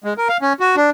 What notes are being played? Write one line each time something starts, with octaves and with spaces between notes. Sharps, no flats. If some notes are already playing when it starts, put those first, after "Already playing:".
G#3
A#4
F5
C#4
F#4
D4